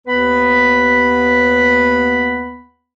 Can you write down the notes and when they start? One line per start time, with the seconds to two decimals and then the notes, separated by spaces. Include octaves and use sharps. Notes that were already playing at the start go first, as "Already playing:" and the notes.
0.07 D#2 B3 B4 B5